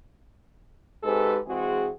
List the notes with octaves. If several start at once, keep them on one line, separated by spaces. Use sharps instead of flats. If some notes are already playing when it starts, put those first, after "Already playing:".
G#2 C3 G#3 G4 A4 B4
E3 G#3 C4 F#4 G#4